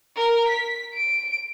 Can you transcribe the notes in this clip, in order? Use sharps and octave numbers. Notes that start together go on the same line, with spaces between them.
A#4
B6
D7